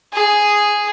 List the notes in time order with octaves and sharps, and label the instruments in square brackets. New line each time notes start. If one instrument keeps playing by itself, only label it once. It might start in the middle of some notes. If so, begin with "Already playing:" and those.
[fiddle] G#4